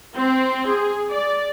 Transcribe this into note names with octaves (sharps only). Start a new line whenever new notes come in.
C4
G#4
D5